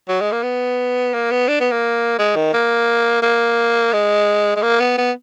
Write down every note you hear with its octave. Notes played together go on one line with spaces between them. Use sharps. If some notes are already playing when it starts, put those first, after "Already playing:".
F#3
G#3
A#3
B3
A#3
B3
D4
B3
A#3
G#3
D#3
A#3
A#3
G#3
G#3
A#3
B3
B3